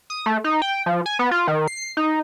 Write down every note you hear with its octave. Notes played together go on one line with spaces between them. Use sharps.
D#6
A3
D#4
G5
F3
G#5
B3
F4
D#3
C7
D#4